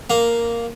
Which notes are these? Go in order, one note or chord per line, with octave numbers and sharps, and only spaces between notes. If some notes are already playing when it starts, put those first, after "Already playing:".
A#3